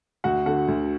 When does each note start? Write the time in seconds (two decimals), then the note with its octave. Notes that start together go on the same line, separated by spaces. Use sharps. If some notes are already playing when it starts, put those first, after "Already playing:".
0.24 D2 F#4 F#5
0.46 D3 A3 F#4 F#5
0.68 D2